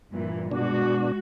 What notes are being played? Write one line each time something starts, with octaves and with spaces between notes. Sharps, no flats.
G2 A#2 E3
B2 G#3 D4 F#4